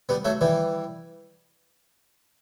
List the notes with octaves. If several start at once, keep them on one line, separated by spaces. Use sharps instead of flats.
G3 B3
F#3 A3
E3 G3